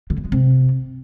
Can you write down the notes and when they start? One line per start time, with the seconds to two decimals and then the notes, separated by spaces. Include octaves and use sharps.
0.10 D3
0.17 E2
0.25 G#3
0.32 C3